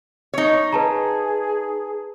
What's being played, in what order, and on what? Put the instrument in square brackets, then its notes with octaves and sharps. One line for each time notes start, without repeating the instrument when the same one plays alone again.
[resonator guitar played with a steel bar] D#4 C#5
[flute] G#4 [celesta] B4 A5 A#5